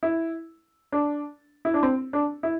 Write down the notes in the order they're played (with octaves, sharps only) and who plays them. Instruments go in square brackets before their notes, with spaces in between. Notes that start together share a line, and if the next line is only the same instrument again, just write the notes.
[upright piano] E4
D4
E4
D4
C4
D4
E4